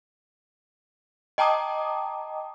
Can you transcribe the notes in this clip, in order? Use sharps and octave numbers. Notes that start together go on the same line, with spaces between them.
D#5 G5 A5 A#5 D6 D#6